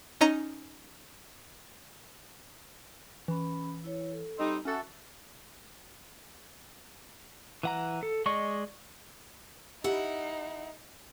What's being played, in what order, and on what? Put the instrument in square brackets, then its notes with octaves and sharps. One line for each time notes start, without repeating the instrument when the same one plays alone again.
[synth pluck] C#4 D#4 D#5 A#5
[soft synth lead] E3 [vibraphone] C#4 B5
[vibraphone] E4 C#5
A4
[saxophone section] G3 C4 D#4
[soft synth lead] C#4 [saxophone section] F#4 A4 [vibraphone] E5 A5
[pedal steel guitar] E3 F#5 A#5
A4
G#3 D5 D#5 C#6
[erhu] D#4 [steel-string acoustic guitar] E4 F#5 [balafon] G4